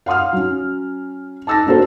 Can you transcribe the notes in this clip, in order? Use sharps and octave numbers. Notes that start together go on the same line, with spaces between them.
F5 F#5 C6 D#6 F6
F#3 C#4
A5 D6 E6 A6 A#6
A#3 D4 F#4 A4 C5